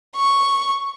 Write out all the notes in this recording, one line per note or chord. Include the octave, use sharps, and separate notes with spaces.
C#6